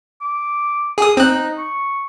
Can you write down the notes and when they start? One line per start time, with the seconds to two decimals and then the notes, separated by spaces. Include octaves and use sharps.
0.21 D6
0.98 G#4 D#6
1.17 C4 D#4 F#6
1.58 C#6